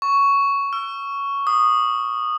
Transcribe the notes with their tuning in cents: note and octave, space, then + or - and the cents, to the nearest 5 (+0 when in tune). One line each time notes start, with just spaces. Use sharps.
C#6 +10
E6 +40
D#6 -15